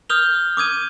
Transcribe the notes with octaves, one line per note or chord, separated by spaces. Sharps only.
D#6 F6 G6 F7 G7
D6 D#6 G#6 D#7